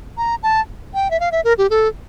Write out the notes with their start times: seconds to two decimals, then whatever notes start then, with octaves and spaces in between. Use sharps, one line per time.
0.18 A#5
0.43 A5
0.94 G5
1.11 E5
1.20 F5
1.32 E5
1.44 A#4
1.58 G4
1.70 A4